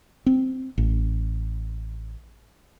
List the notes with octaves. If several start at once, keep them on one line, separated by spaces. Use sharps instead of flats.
C4
A1